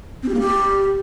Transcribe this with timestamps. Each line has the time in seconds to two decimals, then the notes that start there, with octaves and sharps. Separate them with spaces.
0.23 C4
0.28 G4
0.34 A#3
0.40 G4